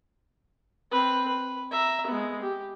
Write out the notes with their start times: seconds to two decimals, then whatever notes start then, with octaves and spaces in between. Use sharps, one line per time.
0.92 C4 B4
1.28 B4
1.71 E5 A#5
2.07 G#3 B3
2.42 G4